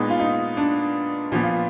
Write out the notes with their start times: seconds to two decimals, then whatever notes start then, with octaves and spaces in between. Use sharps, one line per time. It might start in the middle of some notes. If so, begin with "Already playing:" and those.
Already playing: A#2 G#3 B3 D#4
0.10 F4
0.20 D#4
0.57 D4
1.32 A#2 F3 B3
1.43 F4